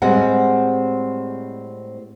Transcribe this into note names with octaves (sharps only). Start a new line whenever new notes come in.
A2 G3 G#3 C4 F#5